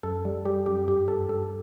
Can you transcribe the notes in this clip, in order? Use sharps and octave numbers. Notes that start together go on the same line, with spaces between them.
F#2 A4
G3
G3 G4
F#2 G4
G2 G4
G2 A4
G2 A4